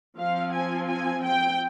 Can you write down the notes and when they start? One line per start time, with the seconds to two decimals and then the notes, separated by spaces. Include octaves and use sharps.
0.18 F3 C4 F5
0.53 G#5
0.88 G#5
1.23 G5